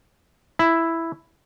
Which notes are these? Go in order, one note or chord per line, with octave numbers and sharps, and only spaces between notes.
E4